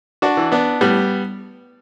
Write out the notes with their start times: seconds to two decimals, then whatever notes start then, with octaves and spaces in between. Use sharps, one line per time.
0.22 D4 F#4
0.37 E3
0.52 B3 D4
0.81 A2 G3 B3